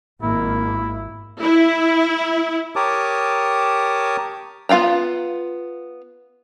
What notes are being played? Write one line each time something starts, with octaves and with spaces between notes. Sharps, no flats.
G#1 A#3 E4
E4
G4 A#4 C#5 A5 D6 D#6
B3 F4 F5 G5 A#5